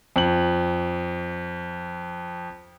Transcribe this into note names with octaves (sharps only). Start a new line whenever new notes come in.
F2 F#7